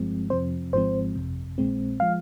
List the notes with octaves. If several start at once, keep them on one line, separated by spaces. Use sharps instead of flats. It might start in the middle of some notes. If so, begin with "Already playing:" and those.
Already playing: G1 G2 F3 G#3 C4
F2 C3 F3 C4 C5
G#1 G#2 F3 G#3 C4 C5
G1 F2 C3
A#1 A#2 G#3 C4
F3 G#3 F5